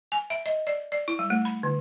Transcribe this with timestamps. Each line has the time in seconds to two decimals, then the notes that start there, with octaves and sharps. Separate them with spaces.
0.12 G#5
0.30 E5
0.46 D#5
0.67 D5
0.92 D5
1.08 E4
1.19 G3
1.30 A3
1.45 B5
1.63 D3